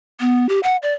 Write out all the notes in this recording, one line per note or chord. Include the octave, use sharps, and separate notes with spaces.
B3
G4
F#5
D5